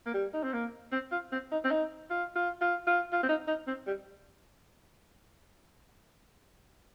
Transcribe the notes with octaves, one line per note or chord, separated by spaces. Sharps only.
A#3
G3
D#4
C4
A#3
C4
F4
C4
D#4
C4
D#4
F4
F4
F4
F4
F4
C4
D#4
D#4
C4
G3